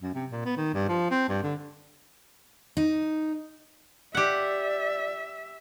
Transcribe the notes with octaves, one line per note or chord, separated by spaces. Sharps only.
F#2
C3
A#2
B3
D#3
G2
F3
C4
G2
D3
D#4
G4 D5 E5 F#5